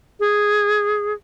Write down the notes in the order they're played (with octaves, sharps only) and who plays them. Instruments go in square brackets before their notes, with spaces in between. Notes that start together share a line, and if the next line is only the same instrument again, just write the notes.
[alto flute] G#4